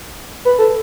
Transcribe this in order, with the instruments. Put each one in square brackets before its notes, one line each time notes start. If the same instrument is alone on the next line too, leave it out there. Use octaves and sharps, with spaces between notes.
[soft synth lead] B4
A4